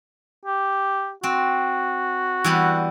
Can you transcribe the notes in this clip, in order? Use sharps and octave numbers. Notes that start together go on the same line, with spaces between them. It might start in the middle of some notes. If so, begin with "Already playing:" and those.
G4
C4 F#4
E3 G3 B3